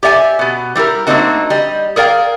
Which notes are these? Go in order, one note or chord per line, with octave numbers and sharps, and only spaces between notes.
G4 D5 E5 F#5 G#5
B2 B3
G3 E4 G4 A#4
A3 A#3 C4 D4 D#4 F#4
G3 D#5
G#4 A#4 D5 F5 G5